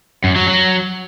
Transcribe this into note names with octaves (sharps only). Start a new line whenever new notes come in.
F#2
F#3
F#3